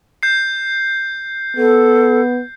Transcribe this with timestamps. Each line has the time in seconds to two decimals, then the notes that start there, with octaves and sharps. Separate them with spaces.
0.23 G6 C7
1.57 B3 A4